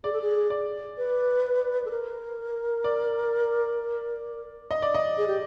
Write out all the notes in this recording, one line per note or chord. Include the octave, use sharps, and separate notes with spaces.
G#4 D5
A4
G#4
D5
B4
A4
A#4
D5
D#5
D5
D#5
G#4
G4